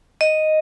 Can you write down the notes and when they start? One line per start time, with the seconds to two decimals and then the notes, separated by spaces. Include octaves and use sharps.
0.21 D#5